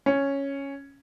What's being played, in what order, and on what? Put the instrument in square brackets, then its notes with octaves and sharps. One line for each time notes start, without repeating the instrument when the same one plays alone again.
[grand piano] C#4